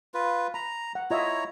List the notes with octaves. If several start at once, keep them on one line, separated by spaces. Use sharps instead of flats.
F4 B4
A#5 B5
F#5
E4 F4 C#5 D#5 E5 A#5